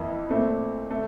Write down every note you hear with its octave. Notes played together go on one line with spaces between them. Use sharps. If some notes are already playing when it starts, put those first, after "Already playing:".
Already playing: F2 E3 A#3 E4
A#2 A3 C4
A3